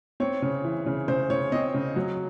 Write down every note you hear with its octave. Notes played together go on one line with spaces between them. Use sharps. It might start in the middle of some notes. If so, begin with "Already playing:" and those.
C4 C#5
C#3
E3
C#3
C#3 C5
C#3 C#5
C4 D#5
C#3
F#3